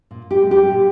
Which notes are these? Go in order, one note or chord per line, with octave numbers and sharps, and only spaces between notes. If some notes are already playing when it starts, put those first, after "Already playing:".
A#2
G4
G#3
G4
A#2